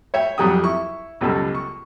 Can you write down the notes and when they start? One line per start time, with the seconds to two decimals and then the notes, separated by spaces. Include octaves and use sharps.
0.14 C#5 E5 G5
0.38 F2 F#3 G3 G5 D#6
0.64 E4 C#6
1.21 C#2 F#2 B2 G3 A4
1.55 C#6